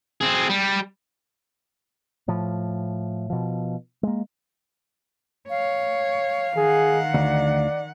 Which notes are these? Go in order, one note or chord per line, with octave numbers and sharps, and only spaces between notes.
C4 G#4
G3
A2 F3
B2 F3
G#3 A#3
C#5 F5
D#3 G#4 F#5
D2 D5